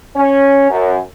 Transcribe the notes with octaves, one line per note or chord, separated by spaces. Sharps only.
C#4
F#2